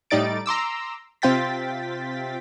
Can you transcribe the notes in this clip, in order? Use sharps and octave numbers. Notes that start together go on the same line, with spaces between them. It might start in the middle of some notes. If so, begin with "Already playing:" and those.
A2 G3 D#4 D5 A6 D7
A#5 C6 D6 E6
C3 C4 F4 G5 A6 B6